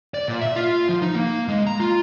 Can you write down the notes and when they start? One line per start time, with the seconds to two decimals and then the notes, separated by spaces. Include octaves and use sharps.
0.14 D5
0.28 A#2
0.41 E5
0.56 F4
0.89 F3
1.02 D#4
1.15 A#3
1.48 G#3
1.67 A#5
1.80 F4